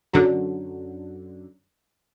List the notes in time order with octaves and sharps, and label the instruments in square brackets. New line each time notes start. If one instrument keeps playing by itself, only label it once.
[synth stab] F#2 D3 F#3